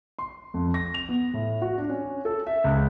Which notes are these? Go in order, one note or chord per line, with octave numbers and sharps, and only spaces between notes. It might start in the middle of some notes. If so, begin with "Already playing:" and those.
C6
F2
A#6
F7
B3
A2
F#4
D4
C#4
A4
E5
C#2